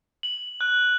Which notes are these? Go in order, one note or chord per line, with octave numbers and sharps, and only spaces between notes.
F#7
F#6